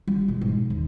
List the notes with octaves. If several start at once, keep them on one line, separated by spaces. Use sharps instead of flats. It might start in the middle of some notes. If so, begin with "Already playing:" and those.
G3
B2
G#2
D#2